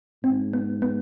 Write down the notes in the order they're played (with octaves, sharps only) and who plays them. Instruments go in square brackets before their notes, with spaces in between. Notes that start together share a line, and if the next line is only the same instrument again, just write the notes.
[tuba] G#2 [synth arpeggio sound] C4
[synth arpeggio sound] B3
B3